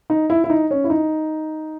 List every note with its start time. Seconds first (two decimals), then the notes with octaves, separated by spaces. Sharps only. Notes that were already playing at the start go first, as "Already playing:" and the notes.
0.10 D#4
0.30 E4
0.44 E4
0.50 D#4
0.71 C#4
0.84 E4
0.90 D#4